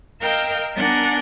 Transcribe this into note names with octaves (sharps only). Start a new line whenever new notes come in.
A#4 D#5 F5 G5 E6 F6
B3 D4 A#4 F#5 G#5 A#5